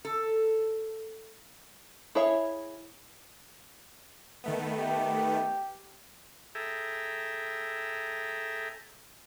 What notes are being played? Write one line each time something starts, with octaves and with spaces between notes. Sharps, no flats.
A4
E4 G#4 C#5 E5 F5
D#3 A3 B3
G4
G#4 A4 E5 G5 A#5